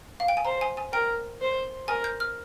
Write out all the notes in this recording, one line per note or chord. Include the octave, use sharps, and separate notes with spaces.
F5
G5
G#5
C5 A#5
G#5
G#5
A#4 G5
C5
A#4 G#5
G6
F6